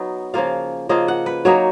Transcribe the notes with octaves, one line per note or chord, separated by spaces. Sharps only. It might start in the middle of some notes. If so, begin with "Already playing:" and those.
Already playing: F#3 B3 D#4
C#3 F3 A#3 F4 F5
C#3 F3 A#3 F4 D#5
F#5
B4
F#3 A#3 D#4 C#5